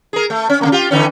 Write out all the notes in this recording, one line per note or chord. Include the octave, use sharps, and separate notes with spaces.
G#4 A#4
A3
C#4
C#3 A3 A#3
F4 G4
D3 E3 C#4